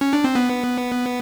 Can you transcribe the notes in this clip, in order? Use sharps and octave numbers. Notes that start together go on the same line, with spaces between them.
C#4
D4
C4
B3